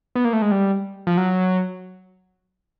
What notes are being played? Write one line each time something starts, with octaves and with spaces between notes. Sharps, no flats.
B3
A#3
A3
G#3
G3
F3
F#3